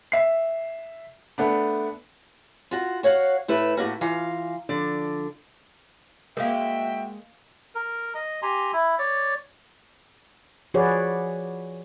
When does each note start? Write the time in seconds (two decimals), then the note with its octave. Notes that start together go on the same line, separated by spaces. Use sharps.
0.12 E5 C7
1.38 A3 B3 D4
2.71 F4 F#4
3.03 F#4 C#5 F5 F#5
3.48 A2 E4 B4
3.77 A2 A#3 B3 F#4
4.01 E3 F4 F5 A#5
4.69 D3 F3 D5
6.37 G#3 A#3 F#4 A#4 E5 F5 G5
7.75 A#4
8.15 D#5
8.42 G4 G#5 A#5 C6
8.73 E4
8.99 C#5 D5
10.74 F3 F#4 G#4 B4 C#5 D5